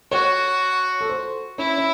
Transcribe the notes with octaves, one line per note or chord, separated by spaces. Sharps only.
F#4 C#5
A4
C5
C#4 E4
C#4